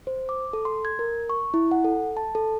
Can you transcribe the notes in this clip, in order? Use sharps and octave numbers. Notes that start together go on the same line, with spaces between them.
C5
D6
A4
C6
G#6
A#4
C#6
E4
F#5
A4
A5
A4